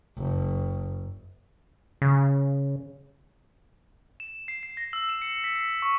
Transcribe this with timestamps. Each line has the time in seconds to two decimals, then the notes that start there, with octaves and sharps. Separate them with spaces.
0.17 F#1
2.02 C#3
4.20 E7
4.48 C7
4.63 C7
4.77 A#6
4.93 E6
5.09 E7
5.22 C#7
5.44 B6
5.56 C7
5.82 C#6